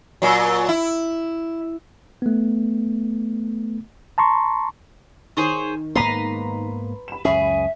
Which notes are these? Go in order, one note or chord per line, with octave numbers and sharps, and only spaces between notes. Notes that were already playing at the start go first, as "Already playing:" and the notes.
A#2 F#3
E4
A3 B3
A5 A#5 C6 C#6
D#3 G#4 C5 C#5
G#2 A#3 B3 B4 A#5 C6
B5 E7
C#2 F#2 C#4 G#4 E5